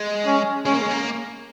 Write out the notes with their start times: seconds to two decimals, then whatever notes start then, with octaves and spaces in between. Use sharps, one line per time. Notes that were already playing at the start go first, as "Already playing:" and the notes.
Already playing: G#3
0.26 C#4
0.65 G#3 C#4
0.74 A#3
0.82 G#3
0.91 A#3